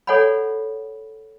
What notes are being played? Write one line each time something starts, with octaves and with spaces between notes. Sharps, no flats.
A4 C#5 D5 F#5 G#5 B5